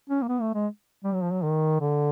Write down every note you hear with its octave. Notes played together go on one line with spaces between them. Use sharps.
C#4
A#3
B3
A3
G#3
G3
F#3
F3
F#3
D#3
D3